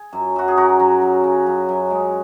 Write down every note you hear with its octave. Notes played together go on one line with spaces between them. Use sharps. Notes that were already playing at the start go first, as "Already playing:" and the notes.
Already playing: G#4
F#2
F#2 F#4
G#4
F#2 F#4 A#4
F#2
F#2
C#3
F#2
F#2
G#3